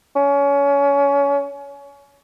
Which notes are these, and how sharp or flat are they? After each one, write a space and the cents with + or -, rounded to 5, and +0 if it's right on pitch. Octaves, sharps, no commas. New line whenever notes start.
C#4 +25